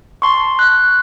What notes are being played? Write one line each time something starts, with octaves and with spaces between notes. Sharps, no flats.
A5 C6 C#6
F#6